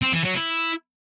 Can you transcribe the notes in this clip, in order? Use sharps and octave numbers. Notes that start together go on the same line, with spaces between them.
C4
E3
F#3
E4